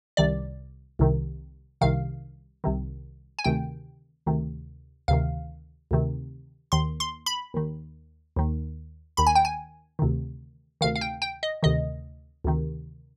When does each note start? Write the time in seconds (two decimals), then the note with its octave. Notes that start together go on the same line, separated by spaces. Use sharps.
0.17 C2 C3 D#3 D5
0.99 C2 C3 D#3
1.81 C2 C3 D#3 F5
2.64 C2 C3 D#3
3.39 G#5
3.44 D2 C3 D#3 G5
4.26 D2 C3 D#3
5.08 D2 C3 D#3 F5
5.91 D2 C3 D#3
6.72 D#2 D#3 C6
7.00 C6
7.26 B5
7.54 D#2 D#3
8.36 D#2 D#3
9.17 D#2 D#3 B5
9.27 G#5
9.35 G5
9.45 G#5
9.99 D2 C3 D#3
10.81 D2 C3 D#3 F5
10.96 F5
11.01 G5
11.22 G5
11.43 D#5
11.63 D2 C3 D#3 D#5
12.44 D2 C3 D#3